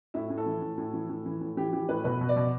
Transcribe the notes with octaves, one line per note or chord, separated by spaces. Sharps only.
A2 E4
A2
A4
E3
A2
A2
E3
A2
E3
A2
E3 G4
E3 G4
A2 B4
B2 B4
B2
D5
B2